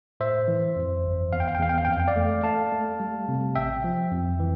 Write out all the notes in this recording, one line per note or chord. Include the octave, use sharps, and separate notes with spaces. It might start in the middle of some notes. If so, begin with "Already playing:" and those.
A2 C5 E5
E3
F2
G1
E2 F5
G5
F5
G5
E2 F5
G5
F5
G5
F2 F5
G5
D5 F5
A3
A3 F5 A5
A3
G3
C3
A1 E5 G5
F3
F2
E3